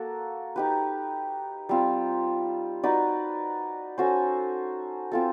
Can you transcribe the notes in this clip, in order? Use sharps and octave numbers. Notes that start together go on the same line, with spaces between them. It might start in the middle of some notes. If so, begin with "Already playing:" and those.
Already playing: A#3 F#4 A4
D#4 G4 B4
G3 C4 F4
D#4 F#4 B4 D5
C#4 F#4 A4 C5
C4 F4 A4